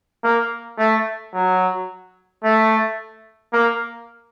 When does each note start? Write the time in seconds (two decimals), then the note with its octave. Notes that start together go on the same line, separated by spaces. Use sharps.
0.24 A#3
0.79 A3
1.34 F#3
2.44 A3
3.53 A#3